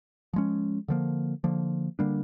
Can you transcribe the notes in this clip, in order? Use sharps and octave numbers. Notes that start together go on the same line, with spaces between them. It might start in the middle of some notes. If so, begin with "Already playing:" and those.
F3 G#3 C#4
D3 F3 A#3
D3 F3 A#3
D3 G3 A#3 D4